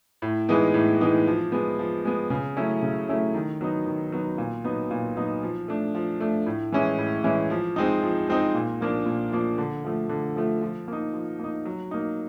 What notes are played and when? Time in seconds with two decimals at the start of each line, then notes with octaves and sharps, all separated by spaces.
0.22 A2
0.49 E3 G#3 B3 D#4
0.74 A2
1.01 E3 G#3 B3 D#4
1.27 F3
1.52 G#3 B3
1.79 F3
2.05 G#3 B3
2.30 C#3
2.56 F#3 A3 C#4 E4
2.83 C#3
3.09 F#3 A3 C#4 E4
3.34 D#3
3.61 F#3 B3 D#4
3.86 D#3
4.12 F#3 B3 D#4
4.38 A#2
4.64 F#3 B3 D#4
4.91 A#2
5.17 F#3 B3 D#4
5.42 F3
5.68 A3 D4
5.95 F3
6.20 A3 D4
6.46 A2
6.72 E3 G#3 C#4 E4
6.98 A2
7.24 E3 G#3 C#4 E4
7.50 F3
7.76 G#3 C4 D#4
8.02 F3
8.29 G#3 C4 D#4
8.54 A#2
8.81 F3 A#3 D4
9.06 A#2
9.32 F3 A#3 D4
9.58 D3
9.84 F3 A3
10.09 D3
10.36 F3 A3
10.61 F3
10.88 A#3 D#4
11.14 F3
11.39 A#3 D#4
11.65 F#3
11.91 A#3 D#4